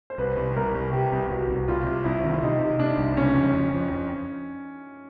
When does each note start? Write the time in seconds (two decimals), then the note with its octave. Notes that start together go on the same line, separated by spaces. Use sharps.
0.10 C5
0.18 C2 B4
0.37 C3
0.56 C2 A#4
0.75 C3
0.93 C3 G4
1.12 C2
1.30 C2 F#4
1.50 C2
1.68 C3 F4
1.86 C3
2.04 C2 E4
2.24 D#3
2.42 C3 D#4
2.60 C3
2.79 C3 D4
2.98 C2
3.17 C#3 C#4
3.35 F2
3.54 F2
3.72 F2
3.92 F2